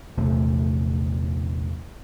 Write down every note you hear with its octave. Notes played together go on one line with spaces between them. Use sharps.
A#1 E2 C3 A3